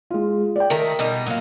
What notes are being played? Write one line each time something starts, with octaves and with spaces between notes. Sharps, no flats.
G#3 F4
D5 G5
D#3 A3 A#4 A#5
B2 G3 D#4
A#2 F#3 F4